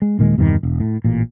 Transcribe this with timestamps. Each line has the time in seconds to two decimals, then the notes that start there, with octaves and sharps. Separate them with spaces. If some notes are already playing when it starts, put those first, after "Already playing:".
0.02 G#3
0.19 D#1 A#2 D#3 G#3
0.38 E2 G2 C3 D#3
0.63 E1
0.80 A2
1.04 A1 A#2